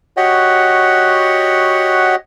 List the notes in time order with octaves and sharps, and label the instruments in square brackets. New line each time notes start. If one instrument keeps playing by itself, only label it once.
[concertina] F#4 G4 C#5 D#5 F#5